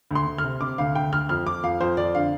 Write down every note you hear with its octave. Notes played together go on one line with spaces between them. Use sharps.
D2 C6
D2
F6
C3
C3 D6
D2 F5
D2 G5
D2 F6
F2 F6
F2 D6
F2 F5
F2 C5
F2 D5
D3 F5